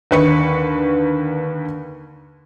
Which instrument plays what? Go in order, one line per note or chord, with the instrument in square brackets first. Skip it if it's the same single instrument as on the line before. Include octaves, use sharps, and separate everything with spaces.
[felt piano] D#2 D3 B4 C#6 C#7